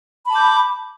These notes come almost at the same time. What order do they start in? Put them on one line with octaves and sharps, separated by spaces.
B5 A5 D6 G6